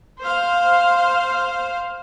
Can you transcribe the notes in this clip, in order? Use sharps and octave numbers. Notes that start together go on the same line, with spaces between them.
C5 F5